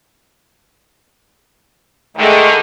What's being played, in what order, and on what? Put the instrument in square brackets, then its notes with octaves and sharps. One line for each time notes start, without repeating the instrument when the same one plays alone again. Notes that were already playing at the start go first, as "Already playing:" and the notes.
[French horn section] D3 D#3 [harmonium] G#3 A3